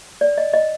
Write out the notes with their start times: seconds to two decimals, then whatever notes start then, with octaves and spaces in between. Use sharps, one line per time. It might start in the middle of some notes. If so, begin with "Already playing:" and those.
0.21 D5
0.38 D#5
0.54 D#5